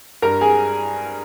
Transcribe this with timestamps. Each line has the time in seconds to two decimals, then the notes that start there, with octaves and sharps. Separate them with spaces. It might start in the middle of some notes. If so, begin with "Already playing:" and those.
0.22 G2 A#4 A#5
0.41 G#4 G#5